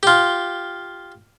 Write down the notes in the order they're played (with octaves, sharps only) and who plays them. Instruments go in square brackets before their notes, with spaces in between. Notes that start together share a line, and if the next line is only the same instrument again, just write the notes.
[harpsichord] F4 G4